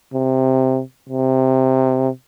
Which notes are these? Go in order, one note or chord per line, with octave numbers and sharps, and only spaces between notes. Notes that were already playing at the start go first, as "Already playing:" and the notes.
C3
C3